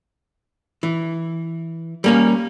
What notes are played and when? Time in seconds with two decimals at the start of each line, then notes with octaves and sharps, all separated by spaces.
0.83 E3
2.04 G3 A#3 C#4